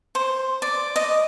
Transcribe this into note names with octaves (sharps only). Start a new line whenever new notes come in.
C5
D5
D#5